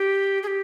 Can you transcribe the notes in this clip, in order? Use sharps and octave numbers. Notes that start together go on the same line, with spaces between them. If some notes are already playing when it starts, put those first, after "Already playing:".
Already playing: G4
G#4
G4